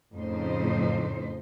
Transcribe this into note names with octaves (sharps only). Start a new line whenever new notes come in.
F2 A2 C#3 D#4 C5